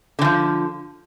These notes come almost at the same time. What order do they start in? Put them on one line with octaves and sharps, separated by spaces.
D3 E3 F3